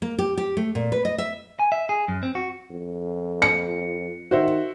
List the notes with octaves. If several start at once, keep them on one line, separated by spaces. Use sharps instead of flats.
A#3
G4
G4
A3
A#2
B4
D#5
E5
G#5
E5
G#4
F#2
C4
F#4
F2
C#7
D#3 F#4 C5 E5